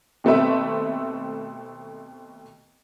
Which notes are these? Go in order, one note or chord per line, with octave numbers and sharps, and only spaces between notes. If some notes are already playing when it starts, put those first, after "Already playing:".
D#2 B2 A3 C4 B4 E5